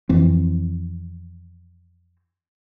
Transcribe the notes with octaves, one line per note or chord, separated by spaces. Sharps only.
F2 E3 C4